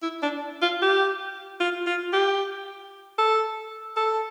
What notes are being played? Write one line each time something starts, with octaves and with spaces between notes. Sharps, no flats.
E4
D4
F4
G4
F4
F4
G4
A4
A4